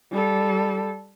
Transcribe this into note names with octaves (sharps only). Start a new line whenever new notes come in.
G3 A4